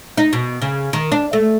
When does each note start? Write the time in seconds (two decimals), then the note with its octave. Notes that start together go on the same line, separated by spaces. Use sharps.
0.18 D#4
0.33 B2
0.62 C#3
0.93 D#3
1.12 D4
1.33 A3